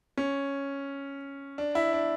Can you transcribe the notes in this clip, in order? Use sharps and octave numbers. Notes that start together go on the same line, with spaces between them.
C#4
D4
E4
D4